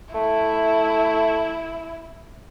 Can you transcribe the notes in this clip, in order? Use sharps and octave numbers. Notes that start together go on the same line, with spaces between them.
A3 E4